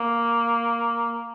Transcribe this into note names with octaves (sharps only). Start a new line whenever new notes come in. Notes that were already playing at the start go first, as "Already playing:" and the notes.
Already playing: A#3